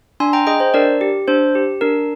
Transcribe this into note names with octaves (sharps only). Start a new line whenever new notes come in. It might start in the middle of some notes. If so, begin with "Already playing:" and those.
D4 G#5 C6
G5 A#5
G#4 D#5 G5
C5
D4 A#4 D5
G4
D4 C5
G4
D4 A#4